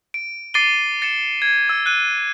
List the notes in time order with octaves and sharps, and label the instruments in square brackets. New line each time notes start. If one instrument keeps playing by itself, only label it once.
[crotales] D7
D6 A6 C7 D7 D#7 G7
A6 C#7 E7
G#6
E6
F#6 D#7